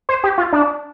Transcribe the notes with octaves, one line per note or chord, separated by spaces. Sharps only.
C5
G4
F4
D4